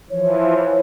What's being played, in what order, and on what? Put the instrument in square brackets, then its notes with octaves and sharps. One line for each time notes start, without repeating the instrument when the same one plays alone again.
[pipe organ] E3 F3 [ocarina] C#5